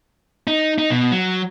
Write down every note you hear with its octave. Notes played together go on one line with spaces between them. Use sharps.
D#4
D#4
B2
F#3